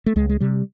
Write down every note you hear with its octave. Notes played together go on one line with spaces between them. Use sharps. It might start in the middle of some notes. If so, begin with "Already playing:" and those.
A3
C#2 G#3
G#3
C3 G3